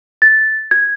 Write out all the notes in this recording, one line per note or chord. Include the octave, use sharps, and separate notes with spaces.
A6
G#6